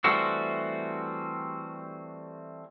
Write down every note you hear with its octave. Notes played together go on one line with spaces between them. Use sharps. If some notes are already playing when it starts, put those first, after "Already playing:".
E3 G3 A3 C4 F#4